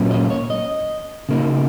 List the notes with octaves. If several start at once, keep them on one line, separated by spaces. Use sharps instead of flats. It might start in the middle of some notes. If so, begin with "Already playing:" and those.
Already playing: A#2 F#3 A#3 C#4
D#5
C#5
D#5
C#3 A#3 D#4